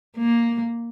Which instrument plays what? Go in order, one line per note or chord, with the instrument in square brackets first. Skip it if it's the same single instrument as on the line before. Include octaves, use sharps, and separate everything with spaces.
[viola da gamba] A#3